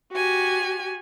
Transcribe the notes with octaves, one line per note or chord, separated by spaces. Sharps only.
F#4 G4 G#5